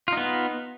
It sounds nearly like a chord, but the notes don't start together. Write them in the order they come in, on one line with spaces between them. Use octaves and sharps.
F4 D#4 B3